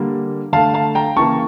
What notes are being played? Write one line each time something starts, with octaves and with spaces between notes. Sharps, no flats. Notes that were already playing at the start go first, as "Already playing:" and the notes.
Already playing: D3 G3 A#3
D3 A3 F5 A5
F5 A5
G5 A#5
C#3 E3 A#3 A5 C#6